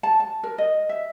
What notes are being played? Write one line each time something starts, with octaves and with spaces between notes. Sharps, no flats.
A5
A5
A#4
D#5
E5